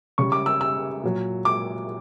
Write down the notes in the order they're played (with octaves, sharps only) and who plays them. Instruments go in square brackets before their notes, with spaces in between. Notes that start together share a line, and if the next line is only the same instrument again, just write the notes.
[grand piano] C#3 G3 C#6
D6
E6
E6
A#2 F#3
D6